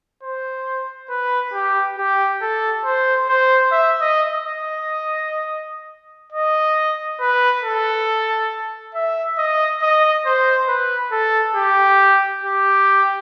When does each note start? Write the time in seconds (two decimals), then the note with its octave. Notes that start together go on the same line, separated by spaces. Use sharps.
0.23 C5
1.10 B4
1.53 G4
1.98 G4
2.41 A4
2.85 C5
3.29 C5
3.72 E5
4.01 D#5
4.29 D#5
6.32 D#5
7.20 B4
7.64 A4
8.94 E5
9.38 D#5
9.82 D#5
10.26 C5
10.68 B4
11.12 A4
11.56 G4
12.43 G4